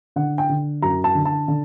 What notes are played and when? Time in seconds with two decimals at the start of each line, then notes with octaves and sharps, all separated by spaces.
0.16 D3 F#5
0.38 G5
0.49 D3
0.82 F#2 A#5
1.04 A5
1.15 D3
1.25 A5
1.48 D3